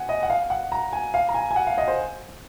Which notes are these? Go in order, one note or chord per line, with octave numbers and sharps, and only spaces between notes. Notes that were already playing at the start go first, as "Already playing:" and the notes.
Already playing: F#5 G#5
D#5
F#5
F5
F#5
A#5
G#5
F5
A#5
G#5
G#5
F#5
F5
D#5
C5